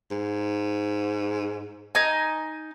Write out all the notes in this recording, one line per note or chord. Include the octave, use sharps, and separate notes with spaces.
G#2
D#4 G#5